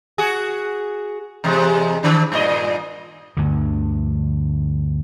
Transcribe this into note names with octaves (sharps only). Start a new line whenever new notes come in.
F#4 G#4
E2 C3 G#3
D#3 D4
G2 A#2 D#5
D2 G2 D3